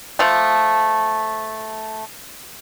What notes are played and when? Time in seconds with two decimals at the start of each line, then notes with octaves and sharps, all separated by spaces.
0.19 F3 A3